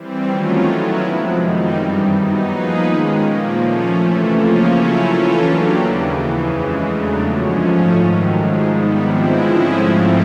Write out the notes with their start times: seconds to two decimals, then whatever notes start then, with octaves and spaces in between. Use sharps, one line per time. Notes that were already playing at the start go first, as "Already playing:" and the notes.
Already playing: E3 G3 C4
0.28 D#3 F#3 A3 C#4 F4
0.65 F#3 B3 E4
1.01 F2 C3 F3 G#3
1.38 F#2 D#3 G3 C4 D#4
1.74 G2 E3 G3
2.11 F#3 B3 D#4
2.47 F3 A#3 D#4 G#4 B4
2.83 D#3 G#3 C#4
3.20 A#2 F3 A#3
3.56 F3 A3 C#4
3.92 C3 E3 A3
4.29 C#3 F3 A#3 C#4 F4
4.65 F#3 A3 C#4 E4
5.02 E3 A3 C#4 F4 A4
5.38 F#3 A#3 D4 G4
5.75 D#2 C#3 E3
6.11 F2 C#3 E3
6.48 C#3 E3 G#3
6.84 E2 C#3 F#3 A3 D4
7.20 F#2 D3 F3 G#3 C#4
7.57 G#2 F3 A3 C#4
7.93 G#2 D#3 F#3
8.30 G#2 F3 G#3
8.66 D#3 G3 B3
9.03 G#2 F3 G#3 C4 E4
9.39 D3 F3 G#3 C#4 E4
9.76 G#2 F3 A3 C4